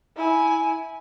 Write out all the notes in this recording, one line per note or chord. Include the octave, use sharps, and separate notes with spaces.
E4 G#5